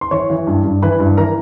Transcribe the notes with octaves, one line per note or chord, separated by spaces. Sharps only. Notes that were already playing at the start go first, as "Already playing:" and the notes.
C6
E3 C#5 C#6
E3
G2
G2
E3 B4 B5
G2
E3 A#4 A#5